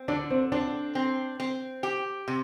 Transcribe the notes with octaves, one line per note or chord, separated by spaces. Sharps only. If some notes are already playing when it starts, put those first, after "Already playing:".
Already playing: C4
D3 D4
C4
C4 D4
C4
C4
G4
C3